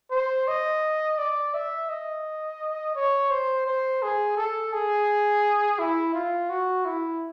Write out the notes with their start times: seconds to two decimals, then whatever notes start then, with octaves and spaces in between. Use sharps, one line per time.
0.11 C5
0.48 D#5
1.18 D5
1.54 E5
1.89 D#5
2.96 C#5
3.31 C5
3.66 C5
4.03 G#4
4.37 A4
4.73 G#4
5.79 E4
6.14 F4
6.50 F#4
6.85 E4